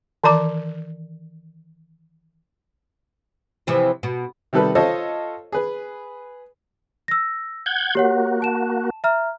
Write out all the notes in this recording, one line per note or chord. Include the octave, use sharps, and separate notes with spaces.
D#3 E3 D5 A#5 D6
C3 E3 F3
B2
C3 D#3 G3 A4 B4
F4 A4 C5 C#5 D#5
G#4 B4
E6 A#6
F#5 G6 G#6
A#3 F#4 G4 C#5 F#5
A5 E7
E5 A#5 F6